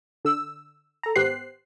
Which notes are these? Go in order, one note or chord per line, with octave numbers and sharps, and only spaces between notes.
D3 E6
A4 A#5
G#1 B3 G4 C5 F#6 C7